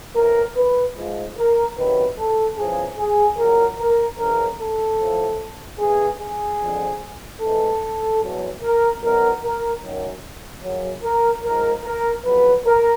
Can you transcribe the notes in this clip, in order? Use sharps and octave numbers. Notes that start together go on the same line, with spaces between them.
A2 E3 A#4
B4
G#2 F3
A#4
E2 C3 D#3 F#3 B4
A4
E2 C#3 F3 G#4
G#4
A#2 F#3 A#4
A#4
F#2 C#3 E3 A#4
A4
A2 F3
G2 E3 G#4
G#4
F2 D3 F3
G#2 E3 A4
E2 B2 F#3
A#4
E2 B2 F#3 A#4
A#4
F#2 D#3 F#3
F#2 C#3 F#3
A#4
G#2 F3 A#4
A#4
F2 C#3 F#3 B4
A#4